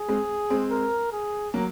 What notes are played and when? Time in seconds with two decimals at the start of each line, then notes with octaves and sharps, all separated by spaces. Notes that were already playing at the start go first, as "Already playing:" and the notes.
Already playing: G#4
0.09 G#3 C4
0.50 G#3 C4
0.71 A#4
1.12 G#4
1.54 F#3 A#3